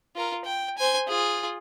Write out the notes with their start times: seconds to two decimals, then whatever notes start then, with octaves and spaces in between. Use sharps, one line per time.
0.16 F4 A#4
0.45 G5
0.78 C5 G#5
1.08 F4 G#4